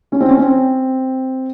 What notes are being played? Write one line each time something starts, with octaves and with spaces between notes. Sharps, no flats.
C#4
C4
C#4
C4